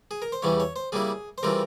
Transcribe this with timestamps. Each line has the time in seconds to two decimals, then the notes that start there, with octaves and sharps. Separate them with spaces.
0.11 G#4
0.22 A#4
0.32 C5
0.42 E2 C#3 E3 G3 C#4 C#5
0.60 C#5
0.76 C5
0.92 C#3 G3 A#3 E4 G#4
1.38 C5
1.43 C#3 E3 G3 C4 F4 A#4